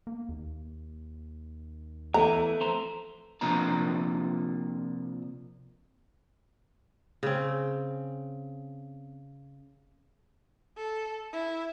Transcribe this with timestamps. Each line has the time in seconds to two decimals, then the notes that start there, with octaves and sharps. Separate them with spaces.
0.07 A#3
0.29 D#2
2.14 E2 E3 A3 A#5
2.61 F2 C5 A#5
3.41 C3 F3 A#3 D4 A#5
7.23 C#3 C4
10.77 A4
11.33 E4